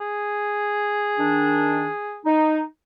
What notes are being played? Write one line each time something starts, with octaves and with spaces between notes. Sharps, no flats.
G#4
D#3 D4
D#4